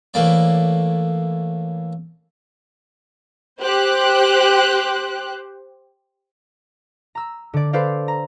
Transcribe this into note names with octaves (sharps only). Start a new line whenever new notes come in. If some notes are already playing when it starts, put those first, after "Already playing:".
A2 E3 A#3 D5
G4 C5 F#6
A#5 E6
D3 D5
A4 B4 C5 D5 F5
A#5